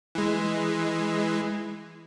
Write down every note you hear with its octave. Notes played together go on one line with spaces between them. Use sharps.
E3 G#3